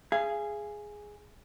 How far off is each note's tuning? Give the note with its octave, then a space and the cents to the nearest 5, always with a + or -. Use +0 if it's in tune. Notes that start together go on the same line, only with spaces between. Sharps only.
G#4 +0 F5 -40